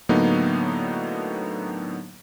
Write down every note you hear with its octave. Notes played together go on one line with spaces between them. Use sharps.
A2 D3 F#3 A#3 B3 D#4